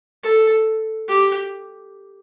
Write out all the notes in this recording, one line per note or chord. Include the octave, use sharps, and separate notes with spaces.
A4
G4